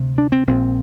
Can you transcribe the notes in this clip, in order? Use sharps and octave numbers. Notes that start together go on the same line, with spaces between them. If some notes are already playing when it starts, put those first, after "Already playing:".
Already playing: D2 C3
D4
C4
A#1 A#2 C4